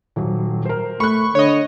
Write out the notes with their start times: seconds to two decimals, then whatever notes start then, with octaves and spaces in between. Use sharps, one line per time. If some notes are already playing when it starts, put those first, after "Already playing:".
0.16 D#1 F#3
0.65 A#4 C5
1.00 A3 B5 C#6 F#6
1.35 D3 C#5 D#5